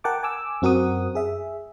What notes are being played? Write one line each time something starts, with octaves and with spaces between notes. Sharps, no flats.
A#4 F#5 G5 A5 D6
G#5 D6 E6
F#2 C4 F#4 A#4 F#5 D#6
G#4 E5